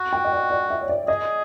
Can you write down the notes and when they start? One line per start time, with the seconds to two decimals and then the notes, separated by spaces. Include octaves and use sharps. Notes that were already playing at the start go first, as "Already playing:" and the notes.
Already playing: F#4
0.13 G5
0.24 D#5
0.32 D5
0.51 D5
0.70 E5
0.81 C#5
0.89 D5
1.08 G#4 D#5